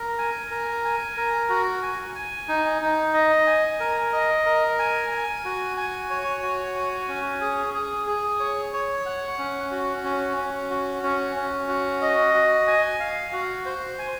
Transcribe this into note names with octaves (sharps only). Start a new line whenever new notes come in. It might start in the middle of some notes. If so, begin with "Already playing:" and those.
Already playing: A#4
G#5
A#4
G#5
A#4
F#4
G#5
G#5
D#4
D#4
D#5
G#5
A#4
D#5
A#4
G#5
G#5
F#4
G#5
C#5
F#4
G#5
C#4
G#4
G#4
G#4
C#5
C#5
F#5
C#4
F#4
C#4
C#4
F#4
C#4
C#4
F#4
D#5
F#4
G#5
F5
F#4
C5
G#5